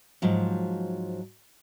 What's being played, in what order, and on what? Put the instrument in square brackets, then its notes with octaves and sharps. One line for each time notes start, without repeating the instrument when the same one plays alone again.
[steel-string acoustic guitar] G#2 F3 F#3